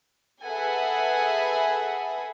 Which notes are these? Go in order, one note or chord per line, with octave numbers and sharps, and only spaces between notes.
G#4 A4 B4 E5 F#5 G#5